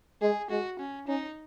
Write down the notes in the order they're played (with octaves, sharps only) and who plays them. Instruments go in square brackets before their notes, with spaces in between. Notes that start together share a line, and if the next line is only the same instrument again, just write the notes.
[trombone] G#3 [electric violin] G#4
[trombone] G#3 [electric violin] F#4
[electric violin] C#4
[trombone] C#4 [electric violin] D#4